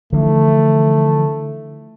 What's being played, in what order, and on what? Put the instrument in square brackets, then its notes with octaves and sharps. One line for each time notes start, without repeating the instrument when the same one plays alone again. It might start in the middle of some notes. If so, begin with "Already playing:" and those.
[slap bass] D3 E3 F3 [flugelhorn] A3